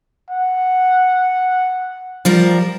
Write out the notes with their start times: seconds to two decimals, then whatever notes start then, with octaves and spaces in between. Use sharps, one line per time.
0.30 F#5
2.25 F3 G3 A#4